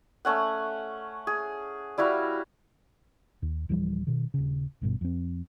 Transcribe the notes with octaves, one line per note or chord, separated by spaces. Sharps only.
A3 C#4 F#5
G#4
G3 E4 F#4 F5
D#2
D1 E3 F3 G3
B2 D#3
D#1 C#3
G#1 G2 B2
F2 C4